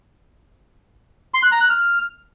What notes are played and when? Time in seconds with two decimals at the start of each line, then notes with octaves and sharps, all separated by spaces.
1.34 C6
1.43 F#6
1.52 A#5
1.61 F#6
1.70 F6